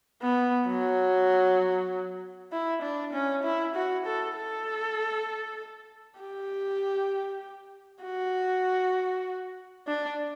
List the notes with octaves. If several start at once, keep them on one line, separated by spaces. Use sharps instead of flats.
B3
F#3
E4
D4
C#4
E4
F#4
A4
A4
G4
F#4
D4